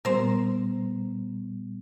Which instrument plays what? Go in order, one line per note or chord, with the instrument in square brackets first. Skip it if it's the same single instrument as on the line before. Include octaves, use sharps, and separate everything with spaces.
[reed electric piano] A#2 G3 B3 [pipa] A#4 C5